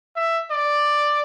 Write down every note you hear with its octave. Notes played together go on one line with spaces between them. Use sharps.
E5
D5